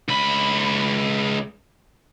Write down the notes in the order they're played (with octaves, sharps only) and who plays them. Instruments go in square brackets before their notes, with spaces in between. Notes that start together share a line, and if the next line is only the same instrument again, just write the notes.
[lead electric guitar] C#2 B5